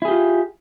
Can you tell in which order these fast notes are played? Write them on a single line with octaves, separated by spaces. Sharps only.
E4 G#4 G4 F4